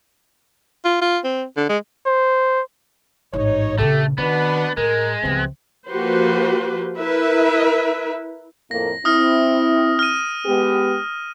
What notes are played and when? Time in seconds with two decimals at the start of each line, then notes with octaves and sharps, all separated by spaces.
0.85 F4
1.02 F4
1.24 C4
1.57 D3
1.69 G#3
2.06 C5
3.33 A1 G#2 D#4 C#5
3.78 A#1 C#3 A3 G4 A4
4.18 B2 D#3 B3 D4 B4
4.77 A2 G#3 A#4
5.23 C#2 C3 F3 B3 C4
5.89 F3 A#3 F#4 G4 B4 C5
6.98 E4 A#4 B4 E5
8.71 F2 A2 A#3 A#6
9.05 C4 E4 D#6 F6 A#6
9.99 F6 D#7
10.46 G#3 B3 G4